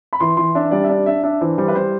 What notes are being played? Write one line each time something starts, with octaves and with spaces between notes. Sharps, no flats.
B5
E3 C6
E3 C6
D4 E5
G3 D5
E5
D4 D5
D4 E5
D4 E5
E3 C5
G3 C5
B4
G3 C5